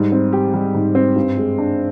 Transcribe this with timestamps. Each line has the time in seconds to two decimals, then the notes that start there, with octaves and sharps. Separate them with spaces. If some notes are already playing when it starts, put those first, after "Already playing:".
Already playing: G#2 G3
0.12 C4
0.33 G4
0.54 G3
0.74 G#2
0.95 C4
1.16 G2
1.37 G#3
1.58 D4